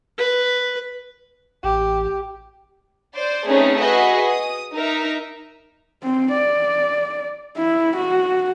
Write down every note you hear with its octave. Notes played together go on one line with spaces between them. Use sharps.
B4
A1 G4
C5 D5
A3 C4 C#4 D#4 G#4 B4
F#4 G#4 B4 D#5 E5
D#6
D#4 A#4 E5
C4
D5
E4
F#4